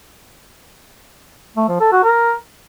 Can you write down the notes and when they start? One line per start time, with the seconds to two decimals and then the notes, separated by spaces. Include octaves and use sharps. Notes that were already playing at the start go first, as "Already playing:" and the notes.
1.57 A3
1.69 F3
1.80 A4
1.92 F#4
2.04 A#4